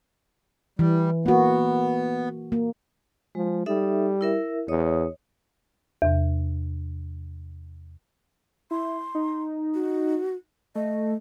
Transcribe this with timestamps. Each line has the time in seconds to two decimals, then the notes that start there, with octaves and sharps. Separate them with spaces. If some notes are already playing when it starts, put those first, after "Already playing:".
0.79 E3 G3
1.26 A#3 B3 F#4
2.52 A#3
3.35 F3 G#3
3.66 G3 D#4 A4 E5
4.21 E4 A#4 E5
4.68 E2 C#5 D#5 D#6
6.02 E2 C3
8.71 E4 C6
9.15 D#4
9.74 F#4
10.75 A3 D#5